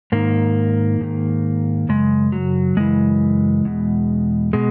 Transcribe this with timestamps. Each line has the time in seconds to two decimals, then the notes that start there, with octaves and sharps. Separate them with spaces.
0.12 G#2 D#3 A#3
1.01 G#2 D#3
1.89 F#2 C#3 G#3
2.32 F#3
2.77 F#2 C#3 E3 G#3
3.65 E2 B2
4.53 B2 G#3